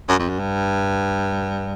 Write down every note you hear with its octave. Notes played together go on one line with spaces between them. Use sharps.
F#2
F2
F#2
G2